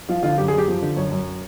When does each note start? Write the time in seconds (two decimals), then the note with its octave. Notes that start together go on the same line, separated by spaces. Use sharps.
0.09 F3 F4
0.23 D3 F4
0.38 F#2 G4
0.48 F#2 G#4
0.58 G4
0.68 F3
0.82 D3
0.96 F#2 C#5
1.11 F#2